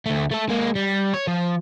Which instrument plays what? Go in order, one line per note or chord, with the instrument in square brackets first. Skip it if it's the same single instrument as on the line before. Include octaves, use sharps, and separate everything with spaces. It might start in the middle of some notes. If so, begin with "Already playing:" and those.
[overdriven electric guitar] D2 A3
A3 A4
G#3 A#3
G3
C#5
F3